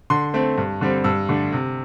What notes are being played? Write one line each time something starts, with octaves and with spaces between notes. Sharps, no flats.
D3 C6
A3 C4
G2
D3 G3 C4
G2 E6
D3 A3 D4
C3